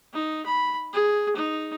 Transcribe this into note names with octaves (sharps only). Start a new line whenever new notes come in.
D#4
B5
G#4
D#4